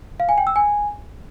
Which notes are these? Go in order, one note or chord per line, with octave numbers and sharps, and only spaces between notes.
F5
G#5
G5
E6
G#5